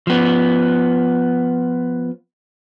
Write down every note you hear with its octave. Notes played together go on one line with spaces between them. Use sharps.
F3 B3